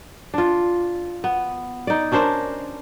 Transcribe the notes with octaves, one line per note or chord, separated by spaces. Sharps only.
D4 F4
B3
D#4 D5
C#4 D4 A#4 C5